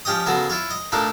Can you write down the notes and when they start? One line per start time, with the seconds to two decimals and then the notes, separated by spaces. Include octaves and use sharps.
0.05 F3 C#4 G4 D#5 D#6
0.26 C#3 F#3 B3 F#4 A4
0.50 E4 F4 C#5
0.70 D#5
0.92 A#2 A3 D4 D#4 A4 A#4